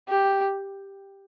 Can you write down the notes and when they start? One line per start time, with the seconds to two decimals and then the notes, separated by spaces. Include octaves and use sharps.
0.09 G4